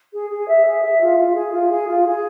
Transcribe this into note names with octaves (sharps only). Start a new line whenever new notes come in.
G#4
G#4
E5
G#4
E5
F4
F4
G#4
F4
G#4
F4
G#4